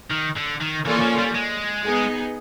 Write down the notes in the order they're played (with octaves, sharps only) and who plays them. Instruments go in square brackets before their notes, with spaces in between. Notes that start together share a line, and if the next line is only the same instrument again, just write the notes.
[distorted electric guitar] D#3
D3
D#3
[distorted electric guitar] E3 [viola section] A#3 C#4 F4 A4 D5
[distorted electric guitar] F3
G3
G#3
[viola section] B3 D#4 G#4